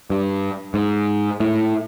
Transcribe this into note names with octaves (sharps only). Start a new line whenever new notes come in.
G2
G#2
A2